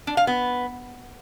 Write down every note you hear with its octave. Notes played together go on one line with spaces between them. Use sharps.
D4
F5
B3